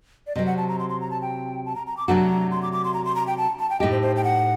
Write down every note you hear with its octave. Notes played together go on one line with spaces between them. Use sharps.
D5
C3 F#3 C4 D#5
F#5
A5
A#5
C6
C6
A#5
A5
G5
A5
A#5
A#5
D6
C3 F#3 A3 D4 F#4 A#5
C6
D6
D6
C6
A#5
C6
A#5
G5
A5
A5
G5
A2 A3 D#4 G4 D#5
C5
C5
G5
F#5